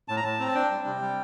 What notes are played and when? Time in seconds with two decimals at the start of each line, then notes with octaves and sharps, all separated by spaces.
0.08 A2 A5
0.17 A#5
0.24 A2 A5
0.39 C4 A#5
0.48 A5
0.55 D4 G5
0.71 G3
0.87 C3
1.01 G3